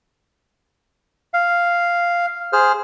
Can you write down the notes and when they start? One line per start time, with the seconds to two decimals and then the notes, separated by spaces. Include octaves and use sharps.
1.34 F5
2.53 G#4 C5 F6